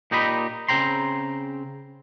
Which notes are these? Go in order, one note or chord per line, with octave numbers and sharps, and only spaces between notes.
A#2 D#4 G4 D#5 B5
C#3 C4 G5 A#5 C6